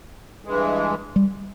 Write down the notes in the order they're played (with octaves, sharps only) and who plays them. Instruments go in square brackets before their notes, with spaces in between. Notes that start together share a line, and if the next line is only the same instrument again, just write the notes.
[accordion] G2 E3 G#3
[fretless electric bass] G3